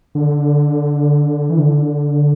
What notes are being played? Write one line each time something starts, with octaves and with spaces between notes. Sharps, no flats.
D3
E3
D3